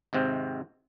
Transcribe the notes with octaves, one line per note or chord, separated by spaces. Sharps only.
G#1 G#2 C3 C4